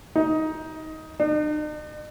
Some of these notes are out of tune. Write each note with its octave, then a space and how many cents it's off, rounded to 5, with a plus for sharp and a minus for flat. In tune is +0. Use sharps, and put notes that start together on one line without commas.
D#4 +15
D#4 -45